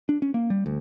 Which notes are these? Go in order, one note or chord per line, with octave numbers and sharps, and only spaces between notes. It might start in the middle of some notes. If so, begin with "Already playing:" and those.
D4
C#4
A#3
G3
D2